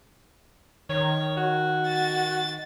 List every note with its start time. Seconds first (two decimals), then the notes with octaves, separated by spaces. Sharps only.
0.89 D#3 C#5
1.37 F#4
1.88 A6